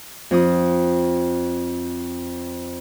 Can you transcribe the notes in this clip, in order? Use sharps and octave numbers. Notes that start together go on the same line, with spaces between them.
F2 D#6